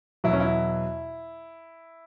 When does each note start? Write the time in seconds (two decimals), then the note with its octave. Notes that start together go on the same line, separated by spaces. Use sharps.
0.24 E2 B2 F#3 E4
0.33 C#4
0.40 E4